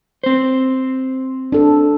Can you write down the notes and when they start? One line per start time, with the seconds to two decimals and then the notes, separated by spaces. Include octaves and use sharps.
0.24 C4 C5
1.52 D4 A4